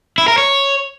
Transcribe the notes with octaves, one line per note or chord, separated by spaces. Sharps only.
E4
A#4
C#5